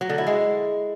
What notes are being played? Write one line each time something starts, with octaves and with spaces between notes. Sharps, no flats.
F#3
D3
E4
G#3